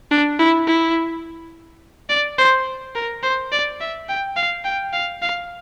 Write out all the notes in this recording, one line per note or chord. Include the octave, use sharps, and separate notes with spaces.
D4
E4
E4
D5
C5
A#4
C5
D5
E5
G5
F5
G5
F5
F5